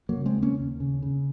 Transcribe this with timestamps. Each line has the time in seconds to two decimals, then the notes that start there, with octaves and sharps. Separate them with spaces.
0.09 F#3 A#3
0.15 C#3
0.26 G#3 C4
0.37 D#2
0.42 A#3 C#4
0.59 D#2
0.80 C#3
1.02 C#3